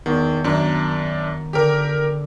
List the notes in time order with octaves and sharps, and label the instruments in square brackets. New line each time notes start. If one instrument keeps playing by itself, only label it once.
[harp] E2 [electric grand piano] D#3
[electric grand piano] F#2 D4 [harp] D#3
[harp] D3 [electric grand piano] G4 A#4